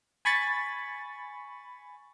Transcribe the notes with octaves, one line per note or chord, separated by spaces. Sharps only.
G#5 B5 C#6 A6